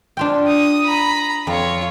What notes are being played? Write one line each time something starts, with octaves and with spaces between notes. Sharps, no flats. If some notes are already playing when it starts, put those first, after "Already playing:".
D4 F4 G5
D#6
A#5 B5
F2 F4 C#5